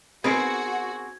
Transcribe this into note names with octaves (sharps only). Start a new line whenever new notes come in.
B3 C4 D#4 F#4 G#4 A#4 B4 G#6